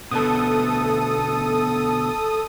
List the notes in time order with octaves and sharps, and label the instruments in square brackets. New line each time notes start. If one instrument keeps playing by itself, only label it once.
[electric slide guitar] B2 D3 B3 [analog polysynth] A4 D#6